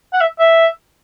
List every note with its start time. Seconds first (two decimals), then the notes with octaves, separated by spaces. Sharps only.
0.13 F#5
0.21 E5
0.39 E5